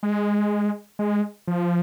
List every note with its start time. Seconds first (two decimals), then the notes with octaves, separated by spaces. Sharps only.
0.03 G#3
0.99 G#3
1.47 F3